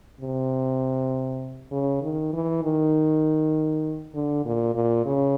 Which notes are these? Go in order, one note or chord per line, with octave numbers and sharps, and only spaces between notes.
C3
C#3
D#3
E3
D#3
D3
A#2
A#2
C#3